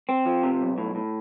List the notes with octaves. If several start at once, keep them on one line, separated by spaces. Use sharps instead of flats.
C4
F3
C3
B1
A2
A2